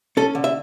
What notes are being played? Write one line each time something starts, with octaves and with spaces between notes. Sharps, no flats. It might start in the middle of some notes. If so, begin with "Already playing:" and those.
C#4 A4
D3
E5